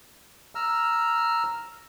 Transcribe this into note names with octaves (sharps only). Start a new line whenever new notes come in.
A#5 E6 F6